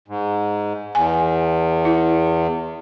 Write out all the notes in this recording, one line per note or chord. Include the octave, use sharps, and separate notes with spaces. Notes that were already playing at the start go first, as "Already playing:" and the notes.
G#2
E2 G#5
E4